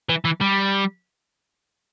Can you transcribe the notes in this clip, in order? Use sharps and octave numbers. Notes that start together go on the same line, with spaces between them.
E3
E3
G3